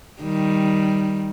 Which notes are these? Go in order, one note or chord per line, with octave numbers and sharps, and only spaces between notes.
D#3 G3